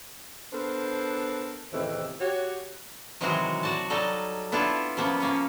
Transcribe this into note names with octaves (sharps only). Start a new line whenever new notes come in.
B3 D4 A4 A#4 C5
E2 A2 C3 D#3 E3 C4
F#4 G4 C#5
C3 D#3 E3 F#3 G#3 F#4
F#4 D5 A5
F#3 G3 D#4 A4
B3 D4 E4 F4 F5
C#3 F3 A#3 B3
C#3 A#3 C#4